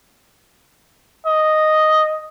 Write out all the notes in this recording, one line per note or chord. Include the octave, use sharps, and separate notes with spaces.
D#5